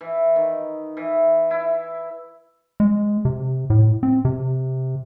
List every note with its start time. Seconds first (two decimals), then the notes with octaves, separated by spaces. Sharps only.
0.01 E3
0.36 D#3
0.97 E3
1.51 E4
2.80 G#3
3.25 C3
3.70 A2
4.03 C4
4.25 C3